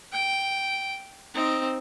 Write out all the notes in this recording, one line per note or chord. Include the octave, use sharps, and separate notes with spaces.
G5
C4 D#4